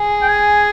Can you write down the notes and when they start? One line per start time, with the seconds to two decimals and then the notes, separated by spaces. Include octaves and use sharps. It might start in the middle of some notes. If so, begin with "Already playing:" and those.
Already playing: G#4
0.22 G5
0.28 G#5